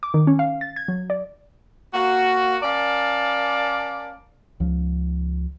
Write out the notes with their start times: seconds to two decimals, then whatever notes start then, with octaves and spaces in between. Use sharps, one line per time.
0.03 D6
0.14 D#3
0.27 C#4
0.39 F5
0.61 A6
0.76 G#6
0.88 F#3
1.10 D5
1.94 A#3 F#4
2.63 C#4 A#4 D5 F5 A5
4.60 C#2 F3